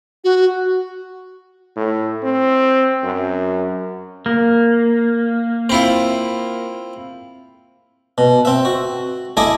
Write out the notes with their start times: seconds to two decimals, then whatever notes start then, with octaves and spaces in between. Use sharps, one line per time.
0.24 F#4
1.76 A2
2.23 C4
3.04 F#2
4.26 A#3
5.70 C4 E4 F4
8.18 B2
8.45 C4 E5
8.65 F#4
9.37 E4 G#4 A4 D#5 E5 D6